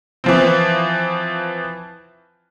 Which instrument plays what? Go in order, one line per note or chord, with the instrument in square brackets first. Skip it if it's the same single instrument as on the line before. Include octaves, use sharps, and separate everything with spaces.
[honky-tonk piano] E3 F3 C4